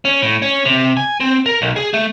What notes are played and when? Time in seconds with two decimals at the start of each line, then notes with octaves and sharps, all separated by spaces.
0.05 C#4
0.22 A2
0.42 C#4
0.65 C3
0.97 G#5
1.20 C4
1.46 A#4
1.62 B1
1.76 G#4
1.94 A3